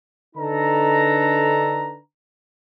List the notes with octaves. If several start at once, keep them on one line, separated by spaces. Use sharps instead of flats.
D3 D4 D#4 A4 B4 A#5